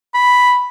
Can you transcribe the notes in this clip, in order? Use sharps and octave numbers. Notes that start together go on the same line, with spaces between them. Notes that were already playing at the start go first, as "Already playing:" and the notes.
B5